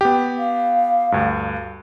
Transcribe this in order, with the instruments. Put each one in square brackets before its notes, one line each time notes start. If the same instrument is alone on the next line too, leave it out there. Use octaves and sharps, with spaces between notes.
[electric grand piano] B3 G4
[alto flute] F5
[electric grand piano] D2 G2